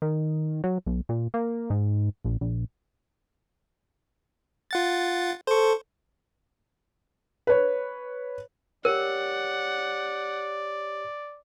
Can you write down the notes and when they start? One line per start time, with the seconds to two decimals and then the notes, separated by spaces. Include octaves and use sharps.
0.02 D#3
0.64 F#3
0.86 B1
1.09 A#2
1.34 A#3
1.70 G#2
2.25 A#1
2.41 A#1
4.71 F4 F#5 A6
5.47 A4 C5 C#6
7.47 B4 C#5
8.85 G4 A#4 C#5 D5 F#5